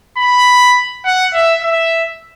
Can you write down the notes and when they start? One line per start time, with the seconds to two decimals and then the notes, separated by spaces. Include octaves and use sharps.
0.18 B5
1.05 F#5
1.34 E5
1.63 E5